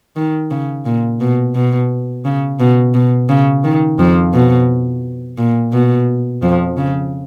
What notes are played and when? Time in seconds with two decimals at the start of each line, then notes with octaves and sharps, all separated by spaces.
0.16 D#3
0.51 C#3
0.86 A#2
1.20 B2
1.55 B2
2.25 C#3
2.60 B2
2.94 B2
3.29 C#3
3.64 D#3
3.99 F2 F3
4.34 B2
5.38 A#2
5.73 B2
6.42 F2 F3
6.77 C#3